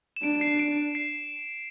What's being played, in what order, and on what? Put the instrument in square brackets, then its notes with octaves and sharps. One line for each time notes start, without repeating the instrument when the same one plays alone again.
[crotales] E7
[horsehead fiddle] D4 [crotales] D7
[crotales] C7
D7
D7
C7